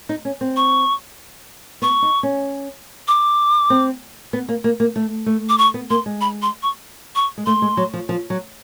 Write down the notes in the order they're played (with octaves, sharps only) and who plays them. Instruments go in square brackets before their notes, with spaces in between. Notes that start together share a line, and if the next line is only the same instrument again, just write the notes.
[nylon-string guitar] D#4
C#4
C4
[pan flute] C#6
[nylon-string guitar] B3 [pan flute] C#6
[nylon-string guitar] D#4
C#4
[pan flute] D6
[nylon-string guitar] C4
B3
A#3
A#3
A#3
A3
A3
[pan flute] D6
C#6
[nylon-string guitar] B3
[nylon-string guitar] A#3 [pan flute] C6
[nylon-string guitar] G#3
[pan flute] B5
C6
C#6
C#6
[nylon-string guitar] G#3
[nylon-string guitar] A3 [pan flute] C6
[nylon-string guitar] G#3
F#3
F3
F3
F#3